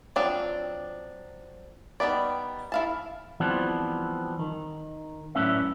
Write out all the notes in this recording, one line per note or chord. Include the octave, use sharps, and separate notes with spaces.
F3 F#3 C4 D4
D#3 G3 B3 D5
E4 F5 A5
E3 F3 G3 B3 C4 D4
D#3
F#2 A2 C#4 D4 B4 E5